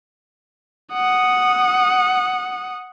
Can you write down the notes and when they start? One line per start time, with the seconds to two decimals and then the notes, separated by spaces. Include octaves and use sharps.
0.93 F#5 D#6